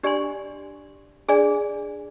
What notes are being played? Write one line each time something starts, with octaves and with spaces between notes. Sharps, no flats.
D4 G4 D5 G#5 C6
D4 G#4 D5 G#5